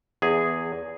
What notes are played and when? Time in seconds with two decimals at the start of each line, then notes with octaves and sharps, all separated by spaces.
0.22 E2 G#4